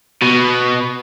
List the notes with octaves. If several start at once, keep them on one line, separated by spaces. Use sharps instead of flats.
B2